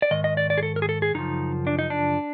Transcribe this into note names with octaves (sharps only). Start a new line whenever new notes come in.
D5
G#2 D#3 D#5
D#5
D5
D5
G#4
A4
A#4
G#4
A4
G#4
F#2 C#3 F3 D#4
D4
D#4
D4